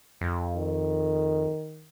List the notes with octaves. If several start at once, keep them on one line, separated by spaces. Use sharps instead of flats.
F2
D#3